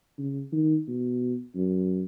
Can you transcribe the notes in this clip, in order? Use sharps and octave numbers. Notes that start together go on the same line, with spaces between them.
C#3
D#3
B2
F#2